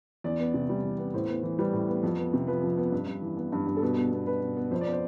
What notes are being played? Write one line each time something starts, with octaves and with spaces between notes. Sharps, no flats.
E2 D5
B3
C3
G3
E2
B3
A2 C5
B3
E3
G3 B4
A2
B3
F2
B3
C3
F3 B4
F2
B3
G2
G2
E3
B3
G2
G2
A4
B2 B4
B3
B3
B2 B4
B2
B3
F2 C5
D5
B3
C5